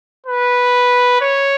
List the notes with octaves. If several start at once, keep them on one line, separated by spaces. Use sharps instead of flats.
B4
C#5